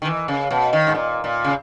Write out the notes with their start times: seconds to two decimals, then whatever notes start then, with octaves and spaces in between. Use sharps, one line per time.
0.02 D#3
0.05 E3
0.28 C#3
0.51 B2
0.73 D#3
0.87 G#2
0.95 A#2
1.24 A#2
1.44 C#3